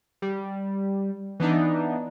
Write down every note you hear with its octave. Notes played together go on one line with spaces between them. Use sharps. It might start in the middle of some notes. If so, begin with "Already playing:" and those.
G3
E3 B3 D4 D#4